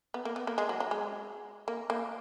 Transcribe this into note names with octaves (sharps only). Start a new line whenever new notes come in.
B3
A#3
B3
A#3
G#3
F#3
F#3
G#3
A#3
A#3